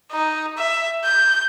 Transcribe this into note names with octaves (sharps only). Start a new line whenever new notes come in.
D#4
E5
G6